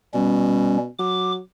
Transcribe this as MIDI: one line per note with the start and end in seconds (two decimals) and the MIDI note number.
0.14 0.88 47
0.14 0.77 55
0.14 0.77 61
0.99 1.39 54
0.99 1.32 86